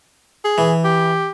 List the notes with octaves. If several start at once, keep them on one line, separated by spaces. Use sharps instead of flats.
G#4
E3
G4